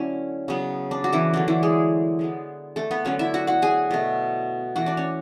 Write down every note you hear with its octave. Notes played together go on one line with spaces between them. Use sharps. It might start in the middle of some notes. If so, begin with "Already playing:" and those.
Already playing: D3 F#3 A3 C#4 E4
C#3 F#3 B3
D4
F#4
E3 E4
D3 F#3 A3 D4
E3 E4
G#3 G#4
D3 G#3 B3
A3 A4
B3 B4
D3 F#3 A3 C#4 C#5
E4 E5
F#4 F#5
F#4 F#5
G#4 G#5
B2 A3
E3 A3 F#4 F#5
D4 D5
C#4 C#5